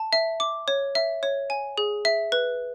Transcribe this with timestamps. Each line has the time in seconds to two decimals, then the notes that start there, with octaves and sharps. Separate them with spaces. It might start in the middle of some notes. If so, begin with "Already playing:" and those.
Already playing: A5
0.13 E5
0.40 D6
0.68 C#5
0.95 E5
1.23 C#5
1.50 G#5
1.78 G#4
2.05 E5
2.32 B4